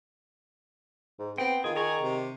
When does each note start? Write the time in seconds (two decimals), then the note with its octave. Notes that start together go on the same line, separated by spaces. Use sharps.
1.19 G#2
1.38 B3 C4 G5
1.64 D#3 F4 G#4
1.76 G#4 D5 A#5 C#6
2.01 C3